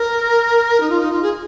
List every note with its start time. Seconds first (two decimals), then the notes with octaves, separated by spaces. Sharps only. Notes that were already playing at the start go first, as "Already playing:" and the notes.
Already playing: A#4
0.80 D#4
0.90 F4
1.00 D#4
1.11 F4
1.22 G#4